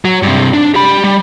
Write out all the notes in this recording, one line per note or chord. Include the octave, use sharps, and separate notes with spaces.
F#3
G2 C3
D4
G4 B5
G3